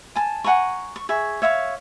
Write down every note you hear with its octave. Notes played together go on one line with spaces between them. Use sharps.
G#5 A5
F#5 G#5 A#5 C#6
C#6
G#4 E5 C#6
C#5 E5 F5 C#6